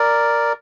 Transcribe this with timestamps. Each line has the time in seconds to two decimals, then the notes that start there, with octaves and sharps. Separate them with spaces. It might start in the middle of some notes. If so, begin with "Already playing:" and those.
Already playing: A#4 D5